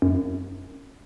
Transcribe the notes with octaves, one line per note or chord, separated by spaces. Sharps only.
F#2